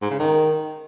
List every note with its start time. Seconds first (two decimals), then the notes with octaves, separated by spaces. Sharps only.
0.02 G#2
0.11 C#3
0.19 D#3